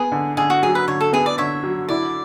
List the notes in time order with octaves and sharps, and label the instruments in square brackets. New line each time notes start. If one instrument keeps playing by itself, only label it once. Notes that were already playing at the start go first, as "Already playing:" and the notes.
Already playing: [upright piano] B3 [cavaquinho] G#4
[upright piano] D3
[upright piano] D3 [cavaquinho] G#4
[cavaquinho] F#4
[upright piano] F#3 [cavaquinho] G#4
[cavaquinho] B4
[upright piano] D3 [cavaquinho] C#5
[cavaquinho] A4
[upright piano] B3 [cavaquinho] G#4
[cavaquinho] D5
[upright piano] D3 [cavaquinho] C#5 E5
[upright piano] F#3
[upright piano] E4 [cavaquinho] D5